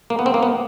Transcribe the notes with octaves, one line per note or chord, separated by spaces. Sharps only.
A#3
B3
C4
A#3
B3